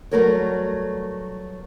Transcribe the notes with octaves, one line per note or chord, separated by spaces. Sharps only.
F#3 G3 A3 A#4 B4 C#5